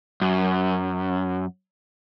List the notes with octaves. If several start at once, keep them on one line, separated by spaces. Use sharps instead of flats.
F#2